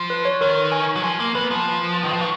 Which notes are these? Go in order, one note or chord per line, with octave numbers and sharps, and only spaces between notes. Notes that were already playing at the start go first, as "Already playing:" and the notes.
Already playing: F3
B4
C#5
D#3 A#4
G#5
F#3
F3 G#5
A#3
B3 B4
F3
D#3
F3 B4
F#3